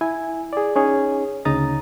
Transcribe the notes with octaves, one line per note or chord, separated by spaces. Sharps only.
E4 G#5
G#4 D5
C#4 D#4 G#4 C#5
D2 C#3 D#4 A#5 D#6 A6